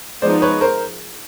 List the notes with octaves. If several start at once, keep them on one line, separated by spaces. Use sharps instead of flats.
F3 G#3 B3 D#4 C5 D5
B4 C#5
A#4 C5